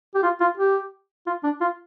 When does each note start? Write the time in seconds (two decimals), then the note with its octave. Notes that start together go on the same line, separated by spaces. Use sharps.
0.15 G4
0.23 F4
0.41 F4
0.57 G4
1.27 F4
1.44 D4
1.61 F4